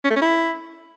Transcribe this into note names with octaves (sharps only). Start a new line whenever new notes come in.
C#4
A3
C#4
E4